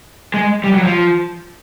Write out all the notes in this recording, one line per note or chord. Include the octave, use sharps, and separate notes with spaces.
G#3
G3
F#3
F3